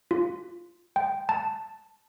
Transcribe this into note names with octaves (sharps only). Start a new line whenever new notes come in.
F4
G5
A5